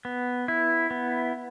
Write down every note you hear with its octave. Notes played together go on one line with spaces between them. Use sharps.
B3
E4
B3